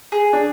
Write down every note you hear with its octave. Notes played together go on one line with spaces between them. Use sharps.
G#4
D4